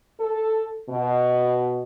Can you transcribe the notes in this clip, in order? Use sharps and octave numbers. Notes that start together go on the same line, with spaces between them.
A4
B2